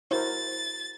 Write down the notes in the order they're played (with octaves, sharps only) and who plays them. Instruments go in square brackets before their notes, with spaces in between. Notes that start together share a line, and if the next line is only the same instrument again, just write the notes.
[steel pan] E4 F#4 A#4 [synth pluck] C5 [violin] A6